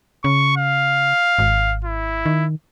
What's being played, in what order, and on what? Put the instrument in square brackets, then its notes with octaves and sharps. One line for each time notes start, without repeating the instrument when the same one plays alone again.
[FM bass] C#3 [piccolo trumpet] C#6
[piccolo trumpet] F5
[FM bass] G#1
[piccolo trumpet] E4
[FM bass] D#3